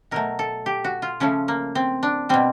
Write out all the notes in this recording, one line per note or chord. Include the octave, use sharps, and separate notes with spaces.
B2 F#3 A3 A#4
A4
G4
F#4
F4
C#3 F3 A3 C#4
A#3
C4
D4
B2 G3 C4